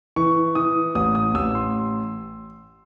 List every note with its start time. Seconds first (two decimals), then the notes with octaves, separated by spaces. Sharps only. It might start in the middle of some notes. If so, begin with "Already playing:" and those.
0.16 E3 C#6
0.55 E3 D#6
0.95 A1 D#6
1.15 D#6
1.34 A1 E6
1.55 C6